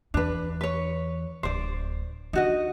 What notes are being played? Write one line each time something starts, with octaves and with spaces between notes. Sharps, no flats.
E2 D4 B4
B4 C#5
D1 C5 D5
D3 D#4 F#4 D#5